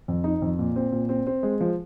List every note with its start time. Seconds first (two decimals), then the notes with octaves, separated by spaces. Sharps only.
0.08 F2
0.24 D#4
0.42 F2
0.59 A#2
0.76 C4
0.92 A#2
1.09 C4
1.27 C4
1.43 G#3
1.60 F3